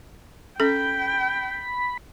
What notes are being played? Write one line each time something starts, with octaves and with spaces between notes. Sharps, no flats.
C#4 A4 G5 B5